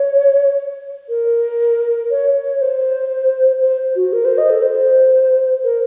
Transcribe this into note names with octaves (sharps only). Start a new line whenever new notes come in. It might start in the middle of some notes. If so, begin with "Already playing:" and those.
Already playing: C#5
A#4
C#5
C#5
C5
C5
F#4
A#4
C5
D#5
A4
C5
A#4